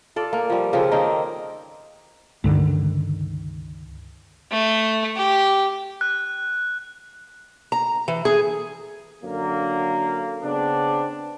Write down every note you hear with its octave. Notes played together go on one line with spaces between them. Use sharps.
F4 A4 D5
A#3
F3 G3
C#3 F3 C4 A4
D#3 A#3 C4 D#4
C#2 G2 D3 D#3
A3
G4
F#6
A#5
E3
G#4
F#2 D3 A#3
C#3 B3 C4 D4